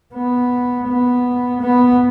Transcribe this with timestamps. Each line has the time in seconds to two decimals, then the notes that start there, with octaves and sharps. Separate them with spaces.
0.14 B3
0.88 B3
1.62 B3